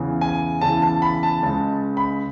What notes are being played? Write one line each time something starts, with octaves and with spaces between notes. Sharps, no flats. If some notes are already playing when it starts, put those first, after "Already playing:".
Already playing: E2 C#3 E3
G#5
E2 C#3 E3 A5
A5
B5
A5
C#2 C#3 G#3 A5
B5